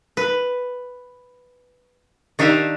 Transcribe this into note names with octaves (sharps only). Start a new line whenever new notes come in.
B4
D#3 D4 G4 E5 F5 A#5